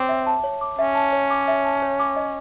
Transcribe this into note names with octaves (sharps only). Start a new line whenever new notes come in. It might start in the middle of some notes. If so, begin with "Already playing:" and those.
Already playing: C4 C#5 D6
E5
A5
C#5
D6
C#4 E5
A5
C#5
D6
E5
A5
C#5
D6
D#5